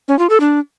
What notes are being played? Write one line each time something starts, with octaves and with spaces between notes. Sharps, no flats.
C#4
F4
A4
D4